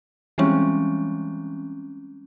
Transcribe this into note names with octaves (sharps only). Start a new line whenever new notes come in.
E3 F3 G3 G#3 C4 C#4